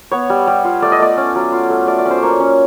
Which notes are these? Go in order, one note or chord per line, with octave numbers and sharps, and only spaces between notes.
B3 C#5
G3
G3
F4
A3 D5
D#5
A3 D5
C#4
F#3
F4
A3
A3 D5
D5
C#4
C5
A#3 C#5 D5
C#4